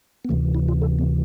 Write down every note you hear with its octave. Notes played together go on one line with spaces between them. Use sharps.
B3
D2 C3 E3 A3
E4
F4
A4
B3